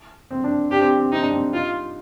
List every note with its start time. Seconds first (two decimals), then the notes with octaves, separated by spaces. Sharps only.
0.31 C4
0.44 D4
0.71 D4 G4
0.80 C4
0.98 C4
1.12 C4 D#4
1.22 D4
1.32 C4
1.54 D#4 F4